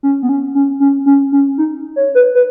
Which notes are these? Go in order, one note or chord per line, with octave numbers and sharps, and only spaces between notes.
C#4
B3
C#4
C#4
C#4
C#4
C#4
D#4
C#5
B4
B4